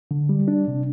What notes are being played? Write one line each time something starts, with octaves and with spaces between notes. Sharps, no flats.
D3
G3
D4
C3